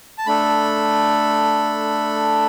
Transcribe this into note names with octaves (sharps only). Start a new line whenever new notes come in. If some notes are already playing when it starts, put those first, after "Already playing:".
A5
A3 D4 A4 B5